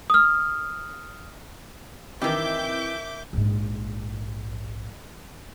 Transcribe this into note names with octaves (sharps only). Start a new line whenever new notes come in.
D#6 F6
D#3 E3 C4 E4 G4 E5 D6 G6
A#1 G#2